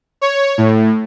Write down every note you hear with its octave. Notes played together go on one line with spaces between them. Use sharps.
C#5
A2